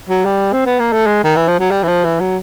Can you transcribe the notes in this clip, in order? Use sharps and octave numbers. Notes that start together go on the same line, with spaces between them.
F#3
G3
C4
B3
A#3
A3
G#3
D#3
E3
F3
F#3
G3
E3
F3
E3
F#3